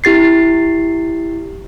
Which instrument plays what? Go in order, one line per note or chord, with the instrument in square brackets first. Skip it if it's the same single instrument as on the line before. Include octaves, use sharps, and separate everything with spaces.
[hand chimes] E4 G4 A6 C7